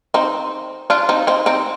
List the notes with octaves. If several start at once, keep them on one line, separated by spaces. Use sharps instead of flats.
C4 D#4
D4 F4
C4 D#4
C4 D#4
C4 D#4